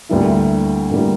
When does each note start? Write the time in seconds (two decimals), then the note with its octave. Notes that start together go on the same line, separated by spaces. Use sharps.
0.09 D2 D3 G3 A#3 E4
0.91 D2 D3 G3 A#3 E4